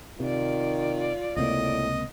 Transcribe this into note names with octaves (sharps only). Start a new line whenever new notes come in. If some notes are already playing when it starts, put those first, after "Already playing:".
C3 D#3 F4 D5
C#2 A2 C3 A#3 D#5